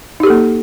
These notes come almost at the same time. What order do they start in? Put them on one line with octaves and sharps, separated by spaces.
D#4 G4 A4 A#3